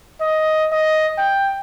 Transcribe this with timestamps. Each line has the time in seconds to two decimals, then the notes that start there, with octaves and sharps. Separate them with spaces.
0.21 D#5
0.72 D#5
1.18 G5